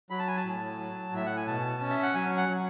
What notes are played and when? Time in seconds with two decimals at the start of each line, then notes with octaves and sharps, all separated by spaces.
0.10 F#3 B5
0.19 A5
0.28 G#5
0.37 A5
0.45 A2
0.78 F#3
1.13 A2 E5
1.26 F#5
1.37 G#5
1.47 B2 A5
1.81 C#4
1.90 E5
2.03 F#5
2.15 F#3 G#5
2.37 F#5
2.49 F#3